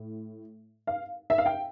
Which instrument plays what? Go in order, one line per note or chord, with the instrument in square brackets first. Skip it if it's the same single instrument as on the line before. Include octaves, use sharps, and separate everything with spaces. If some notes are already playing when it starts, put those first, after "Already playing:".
Already playing: [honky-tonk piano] A2
F5
E5
F5
G5